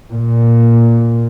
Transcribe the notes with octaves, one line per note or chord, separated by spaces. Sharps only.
A#2